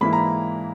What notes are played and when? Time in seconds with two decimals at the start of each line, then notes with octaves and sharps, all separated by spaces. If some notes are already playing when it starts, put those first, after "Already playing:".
0.01 G#2 E3 A#3 E4 B5
0.13 A#5